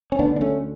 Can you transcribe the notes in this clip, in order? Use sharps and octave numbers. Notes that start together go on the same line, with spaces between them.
C#4
D2 D3 B3 D4
D4
A3 C#4